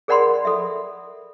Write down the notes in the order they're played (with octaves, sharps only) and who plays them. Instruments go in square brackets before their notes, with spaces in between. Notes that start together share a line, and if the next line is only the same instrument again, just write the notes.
[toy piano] G#4 A#4 D5 F#5 B5 C6
A4 E5